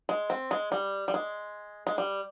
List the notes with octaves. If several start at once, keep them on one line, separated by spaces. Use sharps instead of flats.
G#3
C4
G#3
G3
G3
G#3
G#3
G3